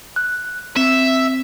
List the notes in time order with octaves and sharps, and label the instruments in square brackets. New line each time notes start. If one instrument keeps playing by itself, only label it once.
[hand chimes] F#6
[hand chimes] C4 [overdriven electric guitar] E5